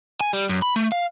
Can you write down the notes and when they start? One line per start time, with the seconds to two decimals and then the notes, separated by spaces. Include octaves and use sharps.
0.21 G#5
0.33 G3
0.49 F#2
0.62 B5
0.76 A3
0.92 F5